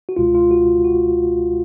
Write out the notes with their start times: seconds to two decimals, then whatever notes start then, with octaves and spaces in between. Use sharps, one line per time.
0.09 F#4
0.16 C#2 B2 G#3 F4
0.35 F4
0.51 F#4
0.84 F#4